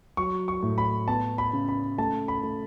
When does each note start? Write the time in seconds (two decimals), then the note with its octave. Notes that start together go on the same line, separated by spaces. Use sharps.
0.17 F#3 C#6
0.48 C#6
0.63 A2
0.78 B5
1.08 B3 A5
1.38 B5
1.53 C#3
1.69 B5
1.98 A3 A5
2.28 B5
2.43 A3